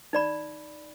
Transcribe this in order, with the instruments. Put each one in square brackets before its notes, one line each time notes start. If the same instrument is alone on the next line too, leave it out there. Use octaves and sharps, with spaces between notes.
[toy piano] D#4 D5 B5